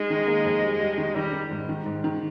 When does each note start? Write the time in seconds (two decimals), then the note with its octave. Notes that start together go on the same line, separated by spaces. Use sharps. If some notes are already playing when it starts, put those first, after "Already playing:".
Already playing: G#3 D#4
0.10 D#3
0.27 A#3
0.45 F2
0.62 G3
0.80 G3
0.98 D#3
1.15 D#3 G3
1.33 D#3
1.50 G#2
1.69 D#3
1.86 G#2
2.04 D#3